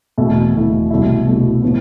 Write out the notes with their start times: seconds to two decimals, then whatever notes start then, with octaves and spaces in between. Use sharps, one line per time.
0.18 E1 E2 B2 A3 E4
0.55 E1 E2 B2 A3 E4
0.90 C2 B2 A3 E4
1.26 C2 B2 A3 E4
1.62 A2 F3 B3